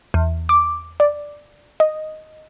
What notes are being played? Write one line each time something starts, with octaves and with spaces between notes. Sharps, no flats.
E2
D6
D5
D#5